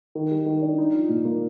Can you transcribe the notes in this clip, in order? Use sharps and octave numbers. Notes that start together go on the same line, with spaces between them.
D#3
G3
D#3
D4
D#4
F3
A#2
A#3